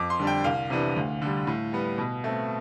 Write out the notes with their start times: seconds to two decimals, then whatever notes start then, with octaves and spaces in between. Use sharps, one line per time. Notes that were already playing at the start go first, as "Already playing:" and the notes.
Already playing: F2 D6
0.10 C6
0.19 D3 G3 D4
0.27 G5
0.44 C2 F5
0.70 C3 E3 B3 D4
0.96 D2
1.22 D3 G3
1.47 A2
1.72 G3 B3
1.98 B2
2.24 A3 C4